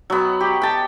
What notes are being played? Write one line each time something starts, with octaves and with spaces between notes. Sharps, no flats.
F#3 B3
G4
G5 A5